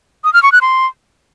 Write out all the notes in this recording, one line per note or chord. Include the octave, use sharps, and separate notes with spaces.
D#6
F6
C#6
F#6
C6